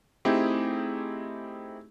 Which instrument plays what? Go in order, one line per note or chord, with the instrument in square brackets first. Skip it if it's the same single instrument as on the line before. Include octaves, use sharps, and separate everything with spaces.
[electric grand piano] A3 C4 D#4 E4 G4 G#4